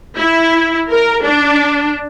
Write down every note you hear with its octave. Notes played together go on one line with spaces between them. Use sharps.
E4
A#4
D4